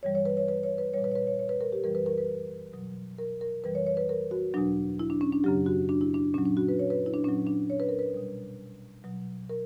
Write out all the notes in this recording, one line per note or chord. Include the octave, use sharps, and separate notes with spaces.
G2 E3 G3 C#5
C#5
B4
C#5
B4
C#5
B4
A#2 G3 C#5
B4
C#5
B4
C#5
C#5
B4
A#4
G4
F#2 E3 G3 A#4
B4
A#4
B4
B2 F#3
A#4
A#4
F#2 E3 G3 B4
C#5
C#5
B4
A#4
F#4
E2 B2 F#3 D4
E4
D4
C#4
D4
F#2 C#3 F#3 G4
F#4
D4
E4
D4
A#2 F#3 C#4
D4
F#4
B4
C#5
B4
E4
D4
A#2 F#3 C#4
D4
C#5
B4
A#4
B4
B2 G3
B2 F#3
A#4